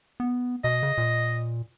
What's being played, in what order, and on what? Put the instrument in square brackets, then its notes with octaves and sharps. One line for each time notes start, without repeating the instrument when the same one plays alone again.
[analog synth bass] B3
[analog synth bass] B2 [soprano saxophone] D#5
[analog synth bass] C#3
A#2